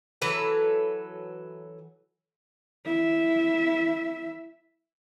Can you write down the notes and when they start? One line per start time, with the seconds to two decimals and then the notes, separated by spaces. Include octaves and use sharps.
0.22 E3 F#3 A4 B4
2.86 E4 E5